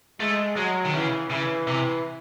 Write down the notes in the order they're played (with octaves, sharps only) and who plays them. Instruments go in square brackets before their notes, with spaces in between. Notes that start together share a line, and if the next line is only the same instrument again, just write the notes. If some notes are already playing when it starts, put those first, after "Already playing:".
[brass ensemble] G#3 [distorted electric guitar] A3
[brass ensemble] F#3 [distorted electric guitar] G#3
[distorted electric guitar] D#3
[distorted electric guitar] C#3 [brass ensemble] E3
[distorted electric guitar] C#3 [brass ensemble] E3
[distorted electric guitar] C3 [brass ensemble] E3